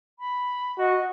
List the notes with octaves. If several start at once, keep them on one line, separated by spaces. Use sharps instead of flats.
B5
F#4 D#5